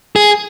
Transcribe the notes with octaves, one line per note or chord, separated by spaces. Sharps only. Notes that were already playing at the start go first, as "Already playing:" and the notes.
G#4